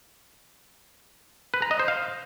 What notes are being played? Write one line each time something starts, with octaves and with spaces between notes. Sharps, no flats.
B4
A#5
D#5
C5
F5